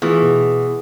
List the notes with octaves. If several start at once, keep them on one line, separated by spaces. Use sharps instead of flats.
E3 A3 B3 F4 G#4 B4
B2